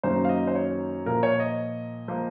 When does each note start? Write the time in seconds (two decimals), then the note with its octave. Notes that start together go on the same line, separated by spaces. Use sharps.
0.03 F#2 D#3 F#3 A#3 C5
0.25 F5
0.29 D#5
0.47 C5
0.55 C#5
1.06 A#2 F3 A#3 A#4
1.23 C#5
1.40 D#5
2.08 F3 A#3